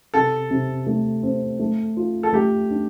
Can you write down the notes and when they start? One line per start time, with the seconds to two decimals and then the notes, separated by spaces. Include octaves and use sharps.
0.14 C3 A4
0.50 C3
0.86 A3
1.23 C4
1.59 A3
1.97 F4
2.23 A4
2.32 A3 G4
2.70 D4